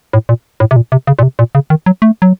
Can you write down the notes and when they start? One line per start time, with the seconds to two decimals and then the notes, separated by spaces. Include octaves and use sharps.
0.13 A2
0.29 A#2
0.60 A2
0.71 C3
0.76 A#2
0.92 C3
1.07 C#3
1.19 A#2
1.23 C3
1.39 A#2
1.55 C#3
1.70 D#3
1.86 F#3
2.02 A3
2.22 F#3